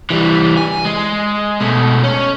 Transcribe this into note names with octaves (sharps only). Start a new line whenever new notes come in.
E3 G3
G#5
G#3
B2 A3
C#4